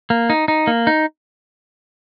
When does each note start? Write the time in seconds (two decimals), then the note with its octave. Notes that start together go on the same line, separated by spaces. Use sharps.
0.10 A#3
0.30 D#4
0.48 D#4
0.67 A#3
0.87 D#4